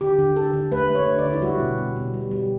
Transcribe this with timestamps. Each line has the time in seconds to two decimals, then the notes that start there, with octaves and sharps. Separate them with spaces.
0.01 D3 G4
0.19 D3
0.36 D3 A4
0.53 D3
0.72 A3 B4
0.90 A3
0.95 C#5
1.07 D3
1.19 D5
1.25 D3
1.33 E4
1.42 G3 F#4
1.60 B2
1.78 B2
1.96 B2
2.14 G3
2.31 G3